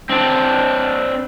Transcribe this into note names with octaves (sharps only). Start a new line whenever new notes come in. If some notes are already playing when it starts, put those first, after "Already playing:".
C4 D4